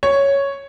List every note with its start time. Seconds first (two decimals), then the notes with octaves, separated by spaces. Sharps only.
0.03 C#5